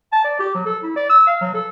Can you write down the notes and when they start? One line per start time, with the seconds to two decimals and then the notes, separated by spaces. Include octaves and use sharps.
0.12 A5
0.24 D5
0.39 G4
0.55 F#3
0.66 A4
0.83 E4
0.96 D5
1.10 E6
1.27 F5
1.41 F#3
1.54 A4